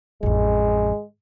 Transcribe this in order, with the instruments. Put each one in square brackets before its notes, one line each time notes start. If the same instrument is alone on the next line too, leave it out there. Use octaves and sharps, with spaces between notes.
[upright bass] A1 F2 [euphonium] G#3